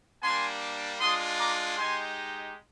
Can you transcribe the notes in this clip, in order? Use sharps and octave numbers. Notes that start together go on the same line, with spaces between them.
G3 A#3 D4 G#5 C6
G#3 D4 F4 C6 D#6
A#5 D6
G#3 D#4 G4 G#5 C6